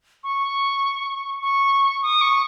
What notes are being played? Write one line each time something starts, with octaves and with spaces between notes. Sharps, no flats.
C#6
C#6
D#6
C#6